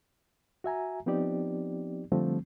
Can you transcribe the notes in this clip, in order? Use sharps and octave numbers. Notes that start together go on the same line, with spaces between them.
F#4 E5 G#5 A#5
F3 B3 C4 D#4 G4 D5
D3 F3 G3 A3 C4